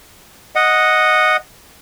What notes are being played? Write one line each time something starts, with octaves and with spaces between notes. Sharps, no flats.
D#5 F#5